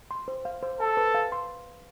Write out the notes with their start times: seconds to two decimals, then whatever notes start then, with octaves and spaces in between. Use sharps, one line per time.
0.11 C6
0.28 C5
0.45 F5
0.63 C5
0.80 A4 A5
0.97 B4
1.14 F5
1.32 C6